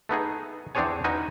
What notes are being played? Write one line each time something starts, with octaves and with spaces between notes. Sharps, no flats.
A3 B3 D#4 G#4
E2 C4 D4 G#4 C#5 G#5
C#4 D#4 F#4 B4 G#5